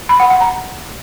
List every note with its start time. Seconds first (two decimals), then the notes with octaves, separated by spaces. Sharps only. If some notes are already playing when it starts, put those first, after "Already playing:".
0.09 B5
0.20 F#5
0.30 F#5
0.41 A#5